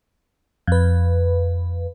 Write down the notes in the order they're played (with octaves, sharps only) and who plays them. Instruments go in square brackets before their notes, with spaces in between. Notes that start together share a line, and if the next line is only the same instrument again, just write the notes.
[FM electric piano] F2 B4